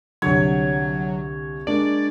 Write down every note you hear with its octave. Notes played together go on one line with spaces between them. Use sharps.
C2 D3 F#3 C#5
G#3 A#3 D4 D5